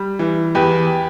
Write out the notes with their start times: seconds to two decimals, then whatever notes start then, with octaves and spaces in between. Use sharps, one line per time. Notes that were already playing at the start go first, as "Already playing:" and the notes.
Already playing: G3
0.19 E3
0.55 E2 G4 B4